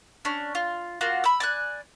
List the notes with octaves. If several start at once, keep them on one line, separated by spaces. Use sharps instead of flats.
C#4 D4
F4
A#3 F4 F#4
B5 E6
D5 G#5 F#6